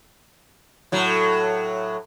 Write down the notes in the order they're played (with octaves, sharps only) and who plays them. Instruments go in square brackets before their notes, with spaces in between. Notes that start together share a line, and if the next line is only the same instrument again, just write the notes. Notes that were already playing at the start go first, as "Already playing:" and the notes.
[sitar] A2 F#3